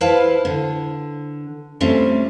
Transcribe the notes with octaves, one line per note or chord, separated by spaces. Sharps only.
E4 B4 C5 F5 A5
D3
G3 A3 C4 C#4 F4